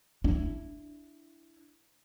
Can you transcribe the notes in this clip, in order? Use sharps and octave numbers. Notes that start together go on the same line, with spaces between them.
D4 E4